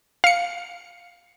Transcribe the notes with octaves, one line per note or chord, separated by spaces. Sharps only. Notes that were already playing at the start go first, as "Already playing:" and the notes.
F5 C#7